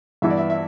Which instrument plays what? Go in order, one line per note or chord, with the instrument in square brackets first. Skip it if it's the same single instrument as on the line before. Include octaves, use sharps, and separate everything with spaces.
[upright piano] G2 E3 B3 E4 [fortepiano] E5
[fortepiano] D5
E5
E5